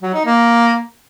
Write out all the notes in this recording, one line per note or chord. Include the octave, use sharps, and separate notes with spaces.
F#3
D#4
A#3